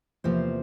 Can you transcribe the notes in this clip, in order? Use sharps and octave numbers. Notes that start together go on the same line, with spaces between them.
E2 C3 F3 A#3 C5